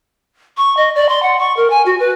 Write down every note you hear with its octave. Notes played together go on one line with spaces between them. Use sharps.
C#6
D#5
D5
C6
F#5
C#6
A#4
G#5
F#4
B4